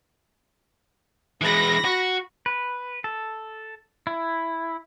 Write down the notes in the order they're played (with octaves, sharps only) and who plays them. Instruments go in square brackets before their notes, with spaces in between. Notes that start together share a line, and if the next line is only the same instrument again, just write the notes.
[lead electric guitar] E3 G#3 [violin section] B5 A#6
[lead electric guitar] F#4
[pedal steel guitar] B4
A4
E4